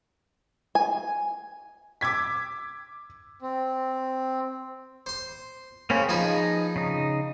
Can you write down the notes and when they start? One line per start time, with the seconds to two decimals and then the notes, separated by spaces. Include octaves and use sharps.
0.75 G#5
2.01 D6 E6 G#6 B6
3.42 C4
5.06 C5 C6
5.90 C#3 A#3 C4 C#4
6.09 F3 D#4 G#4 B4
6.76 C#3 D#4